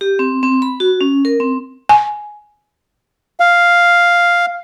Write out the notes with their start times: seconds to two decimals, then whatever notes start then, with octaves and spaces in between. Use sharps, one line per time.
0.01 G4
0.19 C4
0.43 C4
0.62 B5
0.80 F#4
1.01 C#4
1.25 A#4
1.40 C4
1.89 G#5
3.40 F5